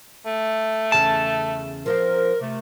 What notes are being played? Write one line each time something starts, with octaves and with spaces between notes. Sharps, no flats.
A3
E2 C#3 C#4 A5
F3 C4 F4 A#4
C3 A3